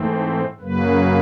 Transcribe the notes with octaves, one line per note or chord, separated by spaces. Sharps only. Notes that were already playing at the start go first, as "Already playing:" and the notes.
Already playing: G#2 E3 A3 C4
F#2 C#3 F#3 A#3 B4